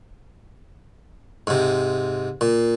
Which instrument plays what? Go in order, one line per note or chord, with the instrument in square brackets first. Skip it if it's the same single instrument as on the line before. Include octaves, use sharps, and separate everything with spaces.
[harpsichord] G#2 C3
A#2